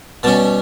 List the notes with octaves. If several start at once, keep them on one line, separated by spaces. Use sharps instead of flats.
B2 G3 C#4 A5